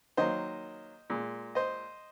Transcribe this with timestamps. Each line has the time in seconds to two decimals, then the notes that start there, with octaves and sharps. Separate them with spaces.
0.17 D#3 F#3 A#3 C5 D#5
1.10 A#2 G#3
1.55 C5 D#5